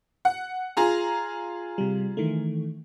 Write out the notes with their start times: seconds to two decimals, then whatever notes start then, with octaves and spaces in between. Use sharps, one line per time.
0.25 F#5
0.77 F4 G#4 A#5
1.78 C3 G3
2.17 D#3 E3 A3